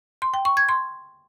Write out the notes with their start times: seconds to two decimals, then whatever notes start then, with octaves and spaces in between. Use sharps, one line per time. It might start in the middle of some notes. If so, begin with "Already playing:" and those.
0.22 C6
0.34 G5
0.45 C#6
0.57 G#6
0.69 C6